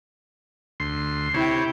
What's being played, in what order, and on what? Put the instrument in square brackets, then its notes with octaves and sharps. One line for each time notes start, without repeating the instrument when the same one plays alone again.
[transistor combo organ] D2 C6
[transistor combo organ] C3 C#5 [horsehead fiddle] E4 G5